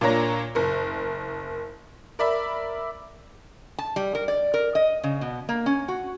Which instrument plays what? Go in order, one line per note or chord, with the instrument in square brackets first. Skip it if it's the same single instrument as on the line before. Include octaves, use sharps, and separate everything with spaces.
[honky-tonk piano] A#2 A#3 D4 C#5 A#5 A#6
F#1 A#4
A#4 D5 E5 B5
[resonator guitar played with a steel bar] A5
G3
A#4
D5
A#4
D#5
C#3
B2
A#3
C#4
F#4